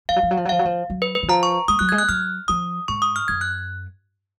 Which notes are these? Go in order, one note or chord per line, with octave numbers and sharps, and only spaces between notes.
F3 F5
F#3
F3
F#3
F3
F#3
F3 F5
F#3
F3
F#3
B4
B4
D#3
F3 A#5
C#6
G#3 D#6
F#3 F#6
G#6
G#3
F#6
F#3 F6
F3 D#6
G#2 C#6
D#6
F6
F#2 G#6
F#6